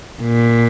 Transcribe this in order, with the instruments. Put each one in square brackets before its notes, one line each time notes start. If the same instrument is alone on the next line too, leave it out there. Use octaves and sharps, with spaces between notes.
[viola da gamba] A#2